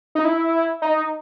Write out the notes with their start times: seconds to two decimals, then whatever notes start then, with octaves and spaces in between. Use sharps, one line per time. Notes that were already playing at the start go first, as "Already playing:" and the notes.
0.15 D#4
0.25 E4
0.82 D#4